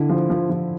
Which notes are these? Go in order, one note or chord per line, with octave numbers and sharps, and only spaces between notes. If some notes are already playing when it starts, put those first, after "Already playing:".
Already playing: D3 E4
F3
F3
F3